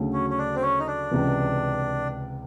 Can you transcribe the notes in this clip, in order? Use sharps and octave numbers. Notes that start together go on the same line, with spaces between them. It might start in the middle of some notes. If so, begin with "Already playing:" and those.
Already playing: D2 C#3 F#3 A3
C#4
C#4
D4
C4
C#4
D#4
D4
C#2 C3 E3